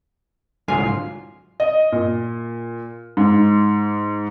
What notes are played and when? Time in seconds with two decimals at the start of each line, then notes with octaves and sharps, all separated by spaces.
0.68 C2 G#2 D3 F#3 F4 G#5
1.60 D#5
1.92 A#2
3.17 G#2